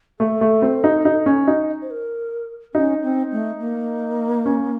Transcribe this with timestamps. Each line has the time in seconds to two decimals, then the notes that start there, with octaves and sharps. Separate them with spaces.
0.19 A3 A4
0.41 A3
0.62 C4
0.84 D#4
1.05 D#4
1.26 C#4
1.47 D#4
1.82 C5
1.90 A#4
2.74 C#4 D#4
3.03 C4
3.32 A3
3.59 A#3
4.45 C#4